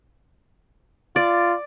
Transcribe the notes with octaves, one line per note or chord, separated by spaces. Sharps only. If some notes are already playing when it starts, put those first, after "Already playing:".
F4 D5